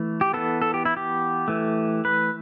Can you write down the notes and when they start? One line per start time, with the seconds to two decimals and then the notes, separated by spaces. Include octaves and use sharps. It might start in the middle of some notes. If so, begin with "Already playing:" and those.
Already playing: E3 A3
0.21 G4
0.34 E3 B3 A4
0.62 A4
0.74 G4
0.85 E4
0.97 G4
1.48 E3 A3
2.05 B4